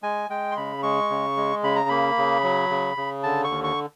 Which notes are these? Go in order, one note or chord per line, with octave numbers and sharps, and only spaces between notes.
G#3 G#5
G#3 G5
C6
C#3 B5
G#3 C#6
C#3
G#3
C#3 B5
A#5
A#3 B5
C#3
F#3
C#3
C#3
D3 A5
C#6
D#2
C#6